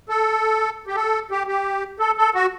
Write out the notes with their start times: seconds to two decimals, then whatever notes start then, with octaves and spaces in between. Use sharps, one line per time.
0.09 A4
0.87 G4
0.95 A4
1.31 G4
1.47 G4
1.99 A4
2.18 A4
2.34 F#4